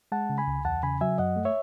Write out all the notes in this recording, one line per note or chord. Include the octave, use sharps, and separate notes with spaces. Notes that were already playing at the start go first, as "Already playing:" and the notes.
G#3 F#5 A5
C#3
G#5 B5
C#2
E2 F#5 A5
C#3 G#5 B5
F#3 E5 G#5
F#2 D#5 F#5
A3
C#5 E5